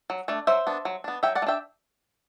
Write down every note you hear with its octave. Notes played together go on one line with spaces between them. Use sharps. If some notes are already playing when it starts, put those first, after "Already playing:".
F#3
A3 D4
F#3 C5 E5
B3 D4
F#3
B3 D4
F#3 E5 G5
D5 F#5
A3
D4 E5 G5